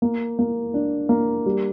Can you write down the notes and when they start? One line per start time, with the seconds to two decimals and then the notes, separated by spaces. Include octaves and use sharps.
0.02 A#3
0.39 A#3
0.74 D4
1.09 A#3
1.46 G3